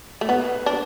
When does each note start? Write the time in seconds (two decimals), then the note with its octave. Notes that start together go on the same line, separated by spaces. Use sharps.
0.21 A3
0.29 B3 B4
0.66 D4